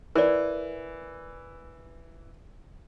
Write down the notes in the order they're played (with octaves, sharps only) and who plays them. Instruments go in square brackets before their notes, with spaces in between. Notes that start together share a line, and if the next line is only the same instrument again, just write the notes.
[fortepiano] E3 [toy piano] A#4 D5